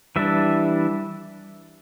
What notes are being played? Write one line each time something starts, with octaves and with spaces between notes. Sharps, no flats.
E3 G3 D4 E5